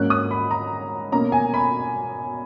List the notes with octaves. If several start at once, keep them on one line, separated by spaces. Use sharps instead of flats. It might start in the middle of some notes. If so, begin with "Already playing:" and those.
Already playing: G#2 F#3 A#3 C#4 F#6
D#6
B5
A#5
B2 A#3 C#4 A#5
G#5
B5